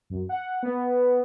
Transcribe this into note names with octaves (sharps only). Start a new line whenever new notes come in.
F#2
F#5
B3